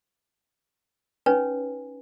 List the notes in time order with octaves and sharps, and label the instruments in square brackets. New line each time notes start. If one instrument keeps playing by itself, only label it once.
[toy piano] C#4 D#4 B4 C#5 G#5